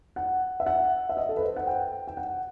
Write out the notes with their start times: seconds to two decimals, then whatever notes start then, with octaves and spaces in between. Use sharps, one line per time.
0.16 F#5
0.60 E5
0.66 F#5
1.09 E5
1.17 D#5
1.29 A4
1.37 B4
1.42 C5
1.56 F#5
1.67 G5
2.08 G5
2.17 F#5